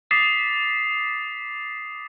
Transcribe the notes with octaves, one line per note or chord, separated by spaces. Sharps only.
D6 D#6 A6 B6 C7